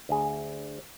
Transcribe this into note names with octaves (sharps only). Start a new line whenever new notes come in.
D2 G#4